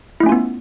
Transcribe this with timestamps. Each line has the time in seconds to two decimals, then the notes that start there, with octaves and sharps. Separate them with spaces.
0.20 E4
0.23 A3
0.26 C#4
0.29 F4
0.32 B3